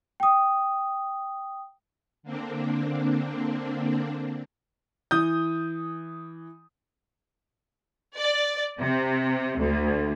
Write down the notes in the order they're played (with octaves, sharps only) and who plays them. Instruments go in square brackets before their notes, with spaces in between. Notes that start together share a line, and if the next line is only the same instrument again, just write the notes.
[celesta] G5 D#6
[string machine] D3 A#3 C4 D4
[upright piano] E3 D#6 G6
[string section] D5
C3
D2